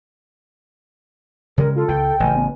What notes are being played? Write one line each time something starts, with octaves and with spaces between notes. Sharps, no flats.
C#3 G3 G#3 A#4
F4 A4
C#2 G5
A1 C#3 G#5
B3